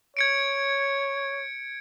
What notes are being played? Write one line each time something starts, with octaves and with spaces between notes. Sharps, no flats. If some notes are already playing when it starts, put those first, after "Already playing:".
C#5 G#6 C#7 D7